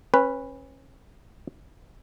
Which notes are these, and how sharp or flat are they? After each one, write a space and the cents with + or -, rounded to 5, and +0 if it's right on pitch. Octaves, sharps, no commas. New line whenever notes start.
C#4 -30 B4 +0